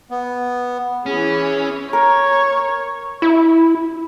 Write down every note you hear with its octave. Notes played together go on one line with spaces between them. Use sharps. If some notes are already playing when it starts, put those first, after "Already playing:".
B3
E3 C#4 E4 G#4
A#4 C#5
E4